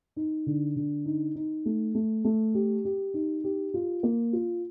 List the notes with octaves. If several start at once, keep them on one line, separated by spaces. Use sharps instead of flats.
D#4
D3
D3
D#4
D#4
A3
A3
A3
G4
G4
D#4
G4
F4
A#3
F4